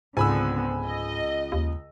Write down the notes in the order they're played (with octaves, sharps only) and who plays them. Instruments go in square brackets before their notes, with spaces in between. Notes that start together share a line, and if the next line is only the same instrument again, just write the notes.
[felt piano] C#2 [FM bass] G#2 [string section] D3 B3 C4 [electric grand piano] G#5 B5 E6
[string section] D#5
[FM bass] D#2